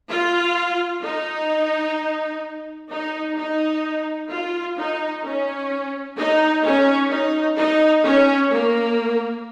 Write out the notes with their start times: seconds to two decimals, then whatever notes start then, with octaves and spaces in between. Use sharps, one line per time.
0.11 F4
1.04 D#4
2.91 D#4
3.38 D#4
4.30 F4
4.77 D#4
5.24 C#4
6.17 D#4
6.65 C#4
7.11 D#4
7.58 D#4
8.04 C#4
8.52 A#3